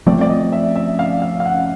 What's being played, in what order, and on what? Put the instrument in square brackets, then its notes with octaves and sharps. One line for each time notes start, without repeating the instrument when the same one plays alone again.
[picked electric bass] F3 A3 C4 [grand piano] D5
[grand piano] D5
D#5
E5
E5
F5
F5
F5
F#5